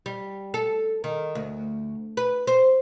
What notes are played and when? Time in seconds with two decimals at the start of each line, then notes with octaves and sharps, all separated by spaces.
0.06 G3
0.54 A4
1.04 D#3
1.35 D2
2.17 B4
2.47 C5